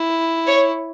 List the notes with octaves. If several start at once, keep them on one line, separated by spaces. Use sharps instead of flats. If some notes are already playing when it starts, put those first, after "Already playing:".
Already playing: E4
C#5